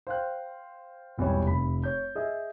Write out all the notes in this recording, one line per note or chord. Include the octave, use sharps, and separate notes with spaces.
C5 F5 G5 F#6
G#1 E2 B2 G3 C#5
F1 B5
C#5 G6
G#4 D#5 E5